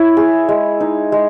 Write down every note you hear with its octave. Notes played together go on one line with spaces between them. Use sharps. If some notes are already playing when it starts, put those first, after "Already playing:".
Already playing: E4 C#5
G#4
G#3
D#4
G#3